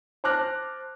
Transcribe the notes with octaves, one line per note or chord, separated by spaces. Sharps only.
C5 A5 D6 F6 F#6 A#6